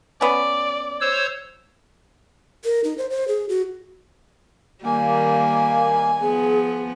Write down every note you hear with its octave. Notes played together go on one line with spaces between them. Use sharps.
B3 C#4 D5
C5 C#5 E6
A#4
D#4
C5
C5
G#4
F#4
D#3 G3 A#3 G#5
F3 B3 G#4